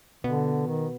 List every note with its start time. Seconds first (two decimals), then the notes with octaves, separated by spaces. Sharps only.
0.24 B2 D3 B3
0.67 D#3